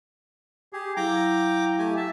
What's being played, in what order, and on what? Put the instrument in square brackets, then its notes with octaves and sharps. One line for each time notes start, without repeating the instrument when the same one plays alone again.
[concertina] G4 G#4
[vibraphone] F#3 E4 F5 [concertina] G5 A#5 D6
[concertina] A3 G4 G#5
E5 A5